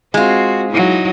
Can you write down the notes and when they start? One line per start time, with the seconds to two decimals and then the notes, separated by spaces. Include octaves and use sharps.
0.14 G#3 C4 F4 F#4
0.71 F#3 D#4 E4